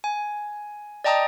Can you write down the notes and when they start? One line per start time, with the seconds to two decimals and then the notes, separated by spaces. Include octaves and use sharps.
0.04 G#5
1.04 D5 D#5 G5 A5 A#5 D#6